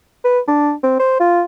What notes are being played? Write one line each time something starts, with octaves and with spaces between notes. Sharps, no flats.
B4
D4
C4
C5
F4